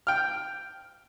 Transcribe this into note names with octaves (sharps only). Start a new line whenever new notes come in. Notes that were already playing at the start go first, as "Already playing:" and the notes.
G5 F6